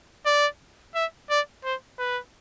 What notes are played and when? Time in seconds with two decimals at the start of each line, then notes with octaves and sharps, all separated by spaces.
0.26 D5
0.95 E5
1.30 D5
1.64 C5
1.99 B4